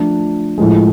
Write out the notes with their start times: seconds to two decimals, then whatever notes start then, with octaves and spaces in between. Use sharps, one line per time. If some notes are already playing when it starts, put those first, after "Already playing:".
Already playing: F3 A3 D4
0.58 A2 F3 G#3